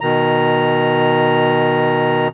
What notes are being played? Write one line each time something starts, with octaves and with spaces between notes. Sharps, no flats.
B2 D#3 A#5